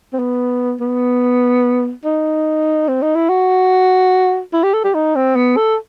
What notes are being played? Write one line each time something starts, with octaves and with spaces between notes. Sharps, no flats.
C4
B3
B3
D#4
C4
D#4
E4
F#4
E4
G4
A4
G4
D#4
C4
B3
A4